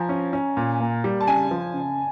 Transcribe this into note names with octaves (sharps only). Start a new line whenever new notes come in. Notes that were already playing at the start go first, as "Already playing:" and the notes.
Already playing: F3 G#5 A#5
C#4
C#4
A#2
A#3
G3
A5
C#3 G#5
F3
C#3